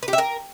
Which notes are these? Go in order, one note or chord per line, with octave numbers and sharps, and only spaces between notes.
B4
G4
E5
A#4